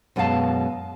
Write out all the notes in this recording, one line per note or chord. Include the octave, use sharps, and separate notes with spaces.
F#2 B2 G#3 G4 F5 A5